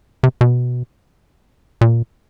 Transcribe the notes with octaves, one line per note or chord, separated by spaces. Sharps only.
C3
B2
A#2